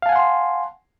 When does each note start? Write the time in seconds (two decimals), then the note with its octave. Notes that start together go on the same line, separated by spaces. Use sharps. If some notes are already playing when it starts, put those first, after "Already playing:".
0.02 F5
0.06 A5
0.09 G#5
0.12 F#5
0.16 C6